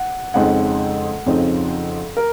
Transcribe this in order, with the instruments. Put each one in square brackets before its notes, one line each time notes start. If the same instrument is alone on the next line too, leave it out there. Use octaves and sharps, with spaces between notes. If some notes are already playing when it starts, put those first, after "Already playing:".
Already playing: [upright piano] F#5
F2 C#3 G#3 C4 D#4 F#5
F2 C#3 F3 C4 D#4
A#4